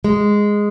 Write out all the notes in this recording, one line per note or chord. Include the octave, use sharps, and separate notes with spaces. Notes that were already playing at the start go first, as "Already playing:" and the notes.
G#3